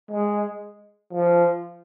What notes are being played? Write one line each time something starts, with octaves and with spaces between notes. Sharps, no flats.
G#3
F3